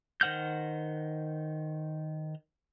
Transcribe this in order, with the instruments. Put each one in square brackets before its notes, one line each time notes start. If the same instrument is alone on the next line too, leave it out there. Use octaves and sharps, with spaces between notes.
[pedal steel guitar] D#3 C5 F#5 F6 G6